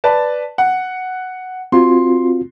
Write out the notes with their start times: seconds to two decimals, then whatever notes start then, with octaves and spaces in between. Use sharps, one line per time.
0.04 B4 D5 A5
0.58 F#5
1.72 C4 F4 F#4 C6